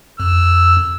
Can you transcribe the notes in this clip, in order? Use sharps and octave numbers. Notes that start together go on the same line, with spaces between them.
F2 E6